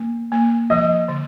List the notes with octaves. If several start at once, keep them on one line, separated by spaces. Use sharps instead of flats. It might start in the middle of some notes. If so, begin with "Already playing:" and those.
Already playing: A#3
A#3
F3 D#5
D3